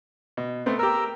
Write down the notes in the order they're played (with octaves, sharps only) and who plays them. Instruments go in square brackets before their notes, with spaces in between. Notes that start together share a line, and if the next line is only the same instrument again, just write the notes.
[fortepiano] B2
A3 B3 C4
[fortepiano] G4 A#4 [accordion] A#5 E6